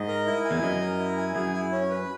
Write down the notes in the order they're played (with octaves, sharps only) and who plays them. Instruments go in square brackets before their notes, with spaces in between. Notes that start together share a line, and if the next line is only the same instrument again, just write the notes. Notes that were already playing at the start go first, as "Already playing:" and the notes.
Already playing: [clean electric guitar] G#2 [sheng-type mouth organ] D#5
[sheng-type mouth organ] A#4
E4
G#5
[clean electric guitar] E2
[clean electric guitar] F#2 [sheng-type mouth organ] D#5
[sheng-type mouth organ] A#4
E4
G#5
[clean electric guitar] F#2 [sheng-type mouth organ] G#4
[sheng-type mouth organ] E4
C#4
B4